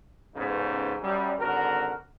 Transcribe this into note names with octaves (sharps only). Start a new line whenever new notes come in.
A1 G#2 C#3 B3 D#4
F#2 G3
G#1 D3 F#4 A#4